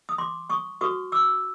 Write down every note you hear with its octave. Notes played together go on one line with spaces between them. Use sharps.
D#6
C6 D6
C#6 D#6
F#4 B4 C#6 D#6
D6 E6